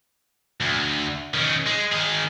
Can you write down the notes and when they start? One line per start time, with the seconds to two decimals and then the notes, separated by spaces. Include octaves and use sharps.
0.62 D2
1.34 D#3 C#4
1.67 G#3
1.93 D#3 G#4